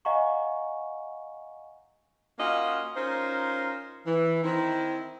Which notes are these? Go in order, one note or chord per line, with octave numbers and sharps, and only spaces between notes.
D#5 F5 F#5 G#5 A#5 C#6
A#3 C#4 F4 F#4 D#5 F5
C#4 D#4 F4 A#4 C5
E3
D#3 C4 E4